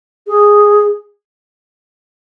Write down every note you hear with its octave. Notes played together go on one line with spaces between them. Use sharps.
G#4